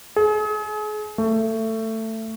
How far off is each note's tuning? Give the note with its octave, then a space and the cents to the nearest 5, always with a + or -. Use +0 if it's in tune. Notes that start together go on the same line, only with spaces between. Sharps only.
G#4 +35
A3 +15